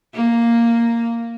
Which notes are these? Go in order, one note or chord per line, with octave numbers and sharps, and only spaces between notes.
A#3